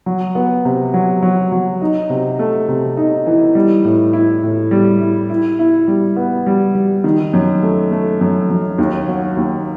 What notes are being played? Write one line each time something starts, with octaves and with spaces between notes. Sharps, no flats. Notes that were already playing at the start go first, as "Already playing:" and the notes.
F#3
B3
C3
F#3
F#3
F#3
D#4
C3
A3
C3
D#4
E3
G3
A2
E4
A2
G3
E4
E4
E4
G3
B3
G3
G3
D#3
F#2
A3
A3
F#2
F#2
D#2
F#3
D#2